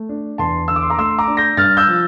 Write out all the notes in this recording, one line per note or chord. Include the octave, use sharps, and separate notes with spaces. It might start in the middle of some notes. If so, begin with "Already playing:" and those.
Already playing: A3
D4
E2 A5 C6
D3 E6
D6
C6
A#5 D6
A3 C6 E6
A#5 D6
D4
G6 A#6
G2 F6 A6
E6 G6
F3